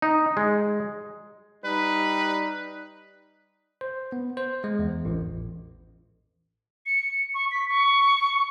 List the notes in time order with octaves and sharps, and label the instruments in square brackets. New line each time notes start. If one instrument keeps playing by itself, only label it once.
[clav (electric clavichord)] D#4
G#3
[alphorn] G3 [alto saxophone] D#4 [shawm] B4
[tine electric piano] C5
B3
C5
G#3
E2
A1
[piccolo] C#7
C#6
B6
C#6